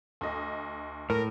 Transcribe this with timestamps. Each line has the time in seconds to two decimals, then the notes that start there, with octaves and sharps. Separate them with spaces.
0.21 D2 D#5
1.10 A2 A#4